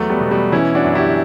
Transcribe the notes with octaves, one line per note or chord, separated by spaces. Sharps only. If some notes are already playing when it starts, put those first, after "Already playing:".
Already playing: E2 F#3 A3
G3 B3
B2
G3 B3
E3 C#4 E4
D4 F#4
F#2
E4 G4